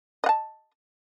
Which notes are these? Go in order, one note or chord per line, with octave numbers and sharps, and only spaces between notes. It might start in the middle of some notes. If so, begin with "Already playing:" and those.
D#5 F#5 A5